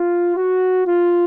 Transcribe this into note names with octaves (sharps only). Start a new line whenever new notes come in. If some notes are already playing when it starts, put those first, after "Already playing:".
Already playing: F4
F#4
F4